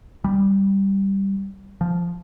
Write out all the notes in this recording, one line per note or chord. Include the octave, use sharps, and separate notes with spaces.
G3
F3